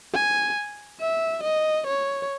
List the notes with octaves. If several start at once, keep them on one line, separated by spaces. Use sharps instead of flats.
G#5
E5
D#5
C#5